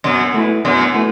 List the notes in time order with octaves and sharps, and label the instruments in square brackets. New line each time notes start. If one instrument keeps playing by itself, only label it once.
[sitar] F#2 [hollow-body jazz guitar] B2
[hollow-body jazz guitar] A3 E4 B4
[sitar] F#2 [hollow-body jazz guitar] B2
[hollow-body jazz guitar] A3 E4 B4